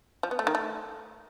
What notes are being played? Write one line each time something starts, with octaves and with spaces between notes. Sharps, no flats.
F3
B3
A3
D#3
A3